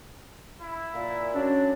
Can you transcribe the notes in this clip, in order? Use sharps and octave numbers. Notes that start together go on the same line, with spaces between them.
E4
A#2
F#3 G#3 C#4 D4